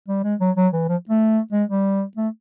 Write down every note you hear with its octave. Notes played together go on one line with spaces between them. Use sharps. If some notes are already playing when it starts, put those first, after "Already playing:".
G3
G#3
F#3
F#3
E3
F3
A3
G#3
G3
A3